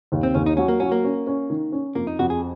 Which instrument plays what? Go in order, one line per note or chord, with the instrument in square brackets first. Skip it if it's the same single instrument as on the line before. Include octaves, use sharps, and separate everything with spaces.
[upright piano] D#2
[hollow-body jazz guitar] C4
[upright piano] D#2 [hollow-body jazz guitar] C#4
[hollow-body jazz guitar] D#4
[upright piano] F#3 [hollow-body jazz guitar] C#4
[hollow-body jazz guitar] A#3
[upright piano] F#3 [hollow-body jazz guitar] C#4
[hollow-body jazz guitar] A#3
[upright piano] C#4
C#4
D#3
C#4
[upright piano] F2 [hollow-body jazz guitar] A#3
[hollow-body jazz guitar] D#4
[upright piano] F2 [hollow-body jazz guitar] F#4
[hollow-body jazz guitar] G#4